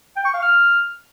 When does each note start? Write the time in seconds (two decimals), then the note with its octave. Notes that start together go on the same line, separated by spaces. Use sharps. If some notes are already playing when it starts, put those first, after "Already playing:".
0.16 G5
0.25 C#6
0.34 F5
0.42 F6